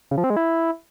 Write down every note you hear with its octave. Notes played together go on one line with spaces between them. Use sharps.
C#3
F3
C4
G#3
E4